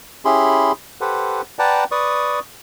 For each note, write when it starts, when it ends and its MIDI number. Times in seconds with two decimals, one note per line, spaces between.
0.25 0.72 61
0.25 0.72 64
0.25 0.72 67
0.25 0.72 68
0.25 0.72 83
0.25 0.72 84
1.01 1.41 67
1.01 1.41 69
1.01 1.41 71
1.01 1.41 72
1.01 1.41 78
1.59 1.84 71
1.59 1.84 74
1.59 1.84 78
1.59 1.84 79
1.59 1.84 81
1.59 1.84 82
1.91 2.39 71
1.91 2.39 74
1.91 2.39 85
1.91 2.39 87